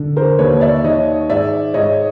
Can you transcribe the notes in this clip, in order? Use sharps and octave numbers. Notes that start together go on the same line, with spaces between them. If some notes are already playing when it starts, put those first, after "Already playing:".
Already playing: D3
A#4 C5
D#2 B4 C#5
D5 E5
D#3 C#5 D#5
G#2 D5 E5
G#2 C#5 D#5